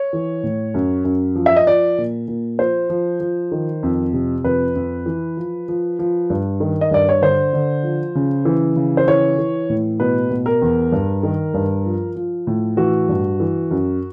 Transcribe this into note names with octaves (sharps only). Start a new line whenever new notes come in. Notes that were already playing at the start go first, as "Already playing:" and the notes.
Already playing: C#5
E3
A2
F#2
F#2
F3
E5
D#5
F3 D5
A#2
A#2
F3 C5
F3
F3
D#3
F2
C3
F2 B4
F2
E3
F3
F3
F3
G2
D#3
D#5
G2 D5
C#5
D3 C5
D3
F3
C#3
E3
C#3
C5
E3 C#5
E3
A2
B2 B4
B2
A#4
E2
G2
D#3
G2
F3
F3
A2
E3 F#4
G2
E3
F#2